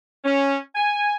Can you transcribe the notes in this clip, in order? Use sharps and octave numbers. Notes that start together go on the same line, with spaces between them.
C#4
G#5